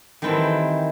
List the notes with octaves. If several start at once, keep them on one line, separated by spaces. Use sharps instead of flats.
D#3 E3 G3 C4 G5 A5